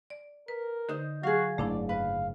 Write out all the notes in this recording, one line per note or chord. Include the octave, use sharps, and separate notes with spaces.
D5
A#4 B4
D3 D#4 C5 D#5
F#3 F#4 G#4 F5
F#1 G#2 C#3 A3 D4 E4 D5
B4 F5